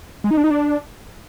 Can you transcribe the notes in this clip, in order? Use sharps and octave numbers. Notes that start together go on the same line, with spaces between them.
G#3
D#4
D4
D#4
D4